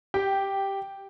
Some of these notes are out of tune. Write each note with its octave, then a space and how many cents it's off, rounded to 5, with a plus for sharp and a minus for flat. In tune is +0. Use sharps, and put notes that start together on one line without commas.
G4 +0 G5 -10